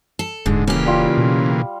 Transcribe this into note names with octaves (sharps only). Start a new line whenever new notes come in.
A4
D#1 G#2 D3 G#3
C#3 E3 A#3 C#4 G4
G3 F4
B2